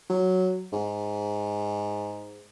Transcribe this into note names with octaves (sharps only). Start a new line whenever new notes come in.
F#3
G#2